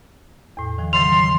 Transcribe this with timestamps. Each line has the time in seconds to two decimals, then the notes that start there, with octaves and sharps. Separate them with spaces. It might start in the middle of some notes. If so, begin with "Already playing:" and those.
0.57 E2 A2
0.78 D#3 F3
0.93 C#3 E3 F#3 C6 F7